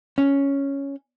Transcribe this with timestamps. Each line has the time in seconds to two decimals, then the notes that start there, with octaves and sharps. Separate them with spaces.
0.18 C#4